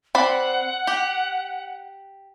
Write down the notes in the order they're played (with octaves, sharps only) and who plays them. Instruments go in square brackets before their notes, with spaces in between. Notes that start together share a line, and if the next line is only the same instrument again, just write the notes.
[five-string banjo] C4 D5 B5 [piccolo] F#5
[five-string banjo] G4